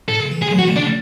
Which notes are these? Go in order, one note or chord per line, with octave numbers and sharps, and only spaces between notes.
A2 A4
C#3
E3
D3 G#4
F#3
E3 F#4
D3
C#3 D4